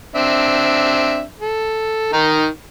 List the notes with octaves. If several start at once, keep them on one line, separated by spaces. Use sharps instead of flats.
C4 D4 E5
A4
D#3 D#4